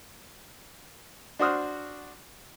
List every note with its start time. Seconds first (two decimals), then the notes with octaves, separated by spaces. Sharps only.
1.39 D4 F#4 C5 D#6 F6